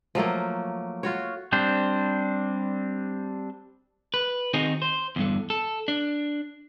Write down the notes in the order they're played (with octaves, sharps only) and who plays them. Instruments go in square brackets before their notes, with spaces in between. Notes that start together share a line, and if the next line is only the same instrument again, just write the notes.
[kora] F3 F#3 A3 A#3
F4 F#4 C#5
[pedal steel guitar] G3 C4 D4 C5
[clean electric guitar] B4
D#3 C4 D#4 F#4 G#4
C5
E2 G2 D3
A4
D4